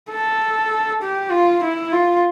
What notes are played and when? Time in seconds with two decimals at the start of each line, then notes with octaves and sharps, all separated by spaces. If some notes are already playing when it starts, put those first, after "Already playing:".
0.11 A4
1.02 G4
1.31 F4
1.62 E4
1.92 F4